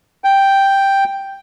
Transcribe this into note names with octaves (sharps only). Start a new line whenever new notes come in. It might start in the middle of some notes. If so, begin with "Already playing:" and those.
G5